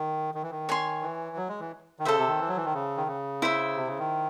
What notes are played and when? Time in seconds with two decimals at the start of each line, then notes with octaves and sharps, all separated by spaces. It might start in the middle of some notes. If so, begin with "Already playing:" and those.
Already playing: D#3
0.34 D#3
0.43 E3
0.51 D#3
0.69 C#5 G#5 C6
1.02 E3
1.36 F#3
1.49 G#3
1.60 E3
1.99 D#3
2.05 C#3 A4 C5 E5
2.17 C3
2.28 D#3
2.40 E3
2.48 F#3
2.56 E3
2.65 D#3
2.74 C#3
2.97 D#3
3.07 C#3
3.42 E4 C5 E5
3.76 C3
3.87 C#3
3.99 D#3